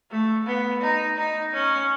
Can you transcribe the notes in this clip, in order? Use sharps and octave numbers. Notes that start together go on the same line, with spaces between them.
A3
B3
D#4
D#4
C#4